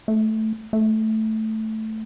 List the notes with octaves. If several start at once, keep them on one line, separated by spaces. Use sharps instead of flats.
A3
A3